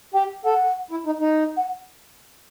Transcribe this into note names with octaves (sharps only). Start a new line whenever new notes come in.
G4 G5
A4 F#5
E4
D#4
D#4
F#5